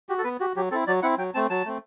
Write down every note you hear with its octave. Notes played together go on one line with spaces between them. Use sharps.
F#4 G4
A4
B3 B4
F#4 G4
F#3 G4
C4 E4 A4
F#3 D5
C4 E4 F#5
F#3 G5
A3 C4 A5
F#3 A5
A3 C4